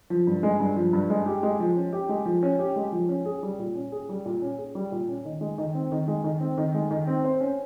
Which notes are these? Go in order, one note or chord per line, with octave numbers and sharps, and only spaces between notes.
F3
G2
G#3
G2
F3
G2
G#3
G4
G#3
F3
C#4
G4
G#3
F3
C#4
G4
G#3
F3
C#4
G#4
G3
A#2
C#4
G#4
G3
A#2
C#4
G#4
G3
A#2
C#4
D#3
G#3
D#3
C4
D#3
G#3
D#3
C4
D#3
G#3
D#3
C4
C5
C#4